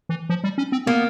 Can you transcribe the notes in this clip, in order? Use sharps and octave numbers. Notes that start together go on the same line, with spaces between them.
E3
F3
G3
C#4
C4
A#3 B3